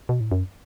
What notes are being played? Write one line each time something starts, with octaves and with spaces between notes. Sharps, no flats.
B2
A2
F#2